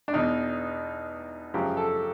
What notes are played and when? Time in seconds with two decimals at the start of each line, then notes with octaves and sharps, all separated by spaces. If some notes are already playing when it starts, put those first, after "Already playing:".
0.08 D4
0.14 E2 B2 D#4
1.54 F#2 C#3 F3 G4
1.77 A4